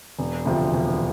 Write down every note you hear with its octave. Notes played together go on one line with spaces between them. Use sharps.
E1
D2 C3 F3
E1